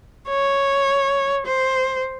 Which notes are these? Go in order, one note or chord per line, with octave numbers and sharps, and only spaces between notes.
C#5
C5